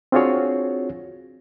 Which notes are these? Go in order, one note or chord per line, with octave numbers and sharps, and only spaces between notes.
C4 D4 F4 F#4 G#4 C#5